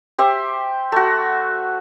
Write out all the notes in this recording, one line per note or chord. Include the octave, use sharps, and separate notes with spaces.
G4 C5 E5
A3 F#4